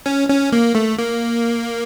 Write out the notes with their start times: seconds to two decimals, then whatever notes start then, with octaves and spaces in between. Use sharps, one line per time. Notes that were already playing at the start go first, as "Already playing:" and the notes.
0.06 C#4
0.29 C#4
0.52 A#3
0.75 A3
0.99 A#3